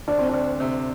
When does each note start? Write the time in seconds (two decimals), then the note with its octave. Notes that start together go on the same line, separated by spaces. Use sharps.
0.08 D2 D4
0.19 C4
0.29 D2 D4
0.60 C3